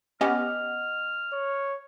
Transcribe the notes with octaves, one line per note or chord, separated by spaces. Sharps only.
B3 C#4 G4 D#5 F#5 F6
C#5